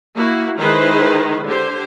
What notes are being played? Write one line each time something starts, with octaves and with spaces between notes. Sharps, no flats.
A#3 E4 F#4
D#3 G#3 E4 G#4 B4 C5
D3 G4 C5